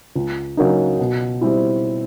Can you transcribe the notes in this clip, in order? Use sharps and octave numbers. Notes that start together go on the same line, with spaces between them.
C#2
C#3 F#3 A#3 D#4
B2
G3 C4 E4